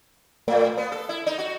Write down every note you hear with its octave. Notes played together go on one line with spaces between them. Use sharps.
A2
B3
A4
E4
D#4
F#4